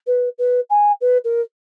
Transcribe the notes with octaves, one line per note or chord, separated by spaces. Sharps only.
B4
B4
G#5
B4
A#4